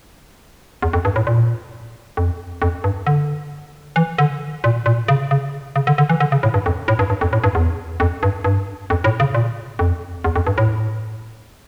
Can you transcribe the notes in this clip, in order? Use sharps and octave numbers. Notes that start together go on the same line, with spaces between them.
E2
F2
G2
A2
A#2
F2
F2
G2
D3
E3
D3
A#2
A#2
C#3
C#3
C#3
D3
D3
E3
D3
C#3
A2
G2
F2
A2
G2
G2
F2
A2
G2
E2
F2
G2
G2
F2
A2
C#3
A#2
F2
E2
F2
G2
A2